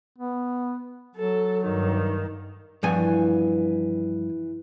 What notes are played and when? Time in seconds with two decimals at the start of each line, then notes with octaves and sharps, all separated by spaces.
0.19 B3
1.16 F#3 A4
1.63 G2 D#3
2.83 G2 E3 F3 B3 G#5